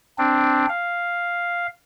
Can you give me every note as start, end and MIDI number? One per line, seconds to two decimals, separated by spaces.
0.18 0.66 60
0.18 0.66 62
0.69 1.67 77